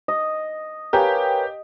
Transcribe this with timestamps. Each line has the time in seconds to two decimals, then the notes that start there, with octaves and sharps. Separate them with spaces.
0.08 D#5
0.93 G4 A#4 B4 C#5 F5 G#5 A#5